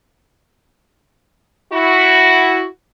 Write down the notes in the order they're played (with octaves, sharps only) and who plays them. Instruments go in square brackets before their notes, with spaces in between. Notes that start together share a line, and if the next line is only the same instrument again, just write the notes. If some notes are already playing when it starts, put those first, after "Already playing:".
[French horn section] E4 F#4